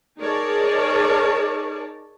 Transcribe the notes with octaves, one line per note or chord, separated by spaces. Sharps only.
D#4 G#4 A#4 C#5 D5 A5